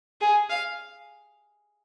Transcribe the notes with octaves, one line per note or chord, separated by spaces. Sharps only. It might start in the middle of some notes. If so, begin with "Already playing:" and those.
G#4
F5